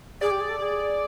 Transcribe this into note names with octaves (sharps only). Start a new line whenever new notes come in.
G#4 D5
G4
G#4
A4
G#4